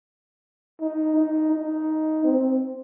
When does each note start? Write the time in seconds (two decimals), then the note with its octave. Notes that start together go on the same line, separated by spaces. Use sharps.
0.81 D#4
1.17 D#4
1.53 D#4
2.24 C4